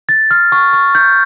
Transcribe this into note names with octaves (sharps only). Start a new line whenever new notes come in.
A6
F6
C#6
C#6
G6